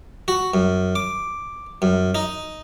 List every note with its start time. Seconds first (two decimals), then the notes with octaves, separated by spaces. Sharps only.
0.28 F#4
0.54 F#2
0.96 D6
1.82 F#2
2.15 D#4